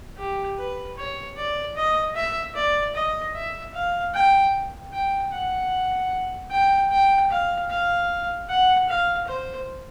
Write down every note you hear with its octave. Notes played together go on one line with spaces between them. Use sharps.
G4
B4
C#5
D5
D#5
E5
D5
D#5
E5
F5
G5
G5
F#5
G5
G5
F5
F5
F#5
F5
C5